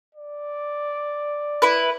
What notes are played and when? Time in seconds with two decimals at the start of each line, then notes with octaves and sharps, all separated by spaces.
0.15 D5
1.62 E4 B4